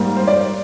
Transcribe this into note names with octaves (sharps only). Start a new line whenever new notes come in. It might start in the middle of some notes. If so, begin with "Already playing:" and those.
Already playing: G#2 G3 A#3
C5
D5